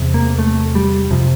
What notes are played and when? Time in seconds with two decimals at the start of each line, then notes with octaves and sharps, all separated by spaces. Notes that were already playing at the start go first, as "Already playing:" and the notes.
Already playing: E2 C3
0.14 A#3
0.39 A3
0.75 G3
1.11 F2 C3 F3